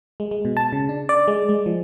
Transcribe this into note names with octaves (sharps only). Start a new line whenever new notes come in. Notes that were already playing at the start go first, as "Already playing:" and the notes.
G#3
G#3
B2
A5
C#3
D4
D5
G#3
G#3
F3